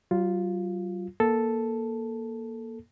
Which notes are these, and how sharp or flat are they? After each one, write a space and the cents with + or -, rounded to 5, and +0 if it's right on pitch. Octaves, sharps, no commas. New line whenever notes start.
F#3 +45 F4 +0
A#3 +15 A4 +0